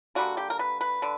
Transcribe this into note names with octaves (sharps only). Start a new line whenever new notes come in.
D3 G3 A#3 F#4
G4
A#4
B4
B4
D3